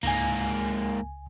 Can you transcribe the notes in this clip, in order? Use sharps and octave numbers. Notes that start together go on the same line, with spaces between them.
C#2 G#2 A#3 G#5